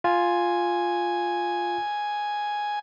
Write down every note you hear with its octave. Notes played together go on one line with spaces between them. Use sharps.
F4 G#5